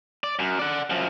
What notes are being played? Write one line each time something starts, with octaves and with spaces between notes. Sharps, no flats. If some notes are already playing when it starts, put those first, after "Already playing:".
D5
F#2
D5 F#5
F#2 F3